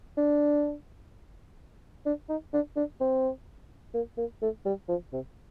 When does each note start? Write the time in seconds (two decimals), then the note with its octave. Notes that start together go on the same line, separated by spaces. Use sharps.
0.17 D4
2.06 D4
2.29 D#4
2.53 D4
2.76 D4
3.01 C4
3.94 A#3
4.18 A#3
4.42 A3
4.66 G3
4.89 F3
5.13 C3